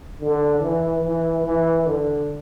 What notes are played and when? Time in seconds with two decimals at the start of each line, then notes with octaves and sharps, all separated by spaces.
0.21 D3
0.61 E3
1.03 E3
1.44 E3
1.86 D3